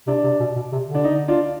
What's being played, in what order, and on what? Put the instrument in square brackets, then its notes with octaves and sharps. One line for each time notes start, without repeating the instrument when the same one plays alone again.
[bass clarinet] C3 [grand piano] D4
[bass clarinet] C3
B2
B2
C3
D3
[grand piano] D4
D#4
D4 F4